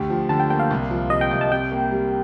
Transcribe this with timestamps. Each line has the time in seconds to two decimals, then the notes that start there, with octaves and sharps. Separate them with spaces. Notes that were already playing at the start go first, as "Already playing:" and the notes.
Already playing: D2 G4 G5
0.10 F3
0.29 D3 A5
0.40 G5
0.50 A#3 G5
0.59 F5
0.70 C2
0.90 F3
1.10 C3 D#5
1.21 G5
1.31 C2
1.41 A5
1.51 C3 G5
1.72 A#3
1.91 G3